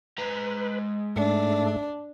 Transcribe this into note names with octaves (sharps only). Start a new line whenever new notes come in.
G#3 B4 A#5
G#2 A3 D4